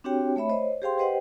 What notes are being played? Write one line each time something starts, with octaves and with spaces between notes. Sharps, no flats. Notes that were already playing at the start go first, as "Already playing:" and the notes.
C4 D4 F#4 G4 C#5 G5
A3 C#5 E5 B5
C5 C#5 D#5
G4 G#4 C5 F5 G5 C6
G4 B4 C5 D#5 F#5 G5